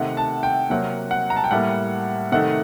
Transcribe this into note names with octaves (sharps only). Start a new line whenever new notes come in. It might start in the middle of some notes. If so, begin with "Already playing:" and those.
Already playing: C3 D#3 A3 F#5
A5
G5
C3 F#3 A#3 F#5
F#5
A#5
A5
G5
A2 G3 A#3 F#5
C3 D#3 A3 F#5